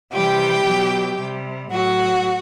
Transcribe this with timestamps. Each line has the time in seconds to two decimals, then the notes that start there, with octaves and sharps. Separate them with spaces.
0.13 C3 E3 G3 G4 G5
0.65 B2 F#3
1.19 C3 G3
1.71 A2 F#3 F#4 F#5